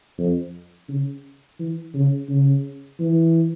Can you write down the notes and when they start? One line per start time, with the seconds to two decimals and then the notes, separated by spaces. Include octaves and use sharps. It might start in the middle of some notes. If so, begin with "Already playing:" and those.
0.19 F2
0.89 C#3
1.59 E3
1.94 C#3
2.29 C#3
3.00 E3